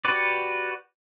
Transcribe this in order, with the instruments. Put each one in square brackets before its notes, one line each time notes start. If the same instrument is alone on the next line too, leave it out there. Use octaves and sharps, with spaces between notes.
[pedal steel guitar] F#4 G4 B4 D5